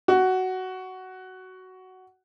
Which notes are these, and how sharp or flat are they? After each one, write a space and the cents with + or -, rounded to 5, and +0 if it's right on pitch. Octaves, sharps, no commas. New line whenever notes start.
F#4 +10